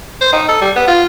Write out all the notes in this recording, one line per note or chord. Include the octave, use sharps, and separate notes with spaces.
C5
D#4
A4
G3
B3
F4